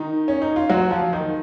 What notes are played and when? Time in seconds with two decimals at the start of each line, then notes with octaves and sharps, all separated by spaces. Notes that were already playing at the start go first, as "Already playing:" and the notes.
Already playing: D#3 D#4
0.28 C#4
0.42 D#4
0.56 F4
0.70 F#3 F#4
0.91 F3 F4
1.13 D#3 D#4